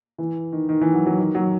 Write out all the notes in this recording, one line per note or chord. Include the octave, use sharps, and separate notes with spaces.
E3
D#3
D#3
E3
F#3
F#3
D#3
F#3